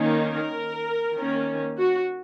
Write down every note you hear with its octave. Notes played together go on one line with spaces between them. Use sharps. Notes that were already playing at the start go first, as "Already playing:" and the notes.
Already playing: D#3 A#3 C#4
A#4
D#3 A#3 C#4
F#4